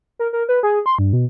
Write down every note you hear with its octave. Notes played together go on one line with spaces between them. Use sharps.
A#4
A#4
B4
G#4
C6
G2
B2